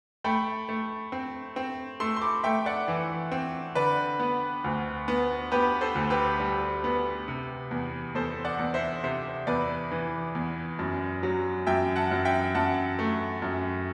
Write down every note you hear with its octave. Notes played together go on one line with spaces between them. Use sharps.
A3 G5 B5
A3
C4
C4
A3 C6 E6
C6
B5 D6
A3 E5 G5
D5 F#5
E3
C4
D3 B4 D5
B3
D2
B3
B3 G4 B4
A4 C5
D2
G4 B4
G3
B3
C3
E2
E2 A4 C5
D5 F#5
E2
C5 E5
C3 C5 E5
E2 B4 D5
E3
E2
F#2
F#3
F#2 E5 G5
F#5 A5
F#2
E5 G5
F#2 F#5 A5
A3
F#2